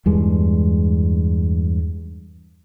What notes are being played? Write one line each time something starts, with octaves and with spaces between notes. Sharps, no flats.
E2 G2 G#3